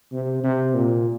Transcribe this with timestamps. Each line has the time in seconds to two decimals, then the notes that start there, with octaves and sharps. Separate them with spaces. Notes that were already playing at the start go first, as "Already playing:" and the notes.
0.12 C3
0.43 C3
0.74 A#2